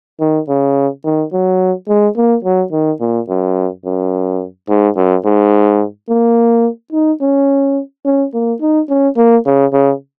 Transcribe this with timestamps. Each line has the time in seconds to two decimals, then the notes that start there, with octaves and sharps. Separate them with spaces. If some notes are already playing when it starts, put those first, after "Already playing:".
0.20 D#3
0.48 C#3
1.05 D#3
1.33 F#3
1.88 G#3
2.17 A#3
2.45 F#3
2.72 D#3
3.00 A#2
3.29 F#2
3.85 F#2
4.69 G#2
4.96 F#2
5.25 G#2
6.09 A#3
6.93 D#4
7.21 C#4
8.06 C#4
8.34 A#3
8.61 D#4
8.89 C#4
9.17 A#3
9.46 C#3
9.73 C#3